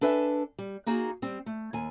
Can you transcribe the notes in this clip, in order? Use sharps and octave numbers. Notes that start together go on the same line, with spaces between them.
D4 A4 B4 E5 G#5
G3
A#3 D#4 F#4 G#4
G3 C4
A3
D#2 G#5